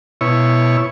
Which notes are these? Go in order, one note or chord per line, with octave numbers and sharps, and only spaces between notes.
B2 E4 C#5